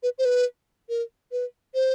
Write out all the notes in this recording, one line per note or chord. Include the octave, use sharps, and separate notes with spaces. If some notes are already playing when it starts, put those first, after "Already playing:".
B4
C5
B4
A#4
B4
C5